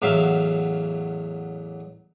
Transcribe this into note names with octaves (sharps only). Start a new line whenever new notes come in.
A1 E2 F#3 E5 F5